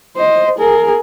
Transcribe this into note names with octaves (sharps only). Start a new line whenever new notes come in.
C5 D#5
G#4 A#4